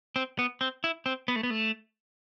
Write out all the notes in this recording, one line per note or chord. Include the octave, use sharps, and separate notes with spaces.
C4
B3
C4
E4
C4
B3
A3
B3
A3